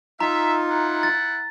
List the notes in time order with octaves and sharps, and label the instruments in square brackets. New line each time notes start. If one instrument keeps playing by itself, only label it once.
[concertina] D#4 F4 [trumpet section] E5 [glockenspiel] A#5
[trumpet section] E4 F#5
[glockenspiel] A6